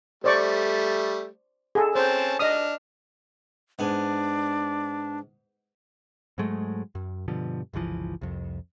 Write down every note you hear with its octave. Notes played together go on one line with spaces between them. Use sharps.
G3 A3 C5 D5 C#6
G#4 A4
C4 C#4 C5 A5
D4 D#5 D#6 F6
G#2 B3 D4 G#5
G#2 F#3 G#3 A3
F#2
G2 B2 D3 F3
G1 C#2 E3 F3
C2 F2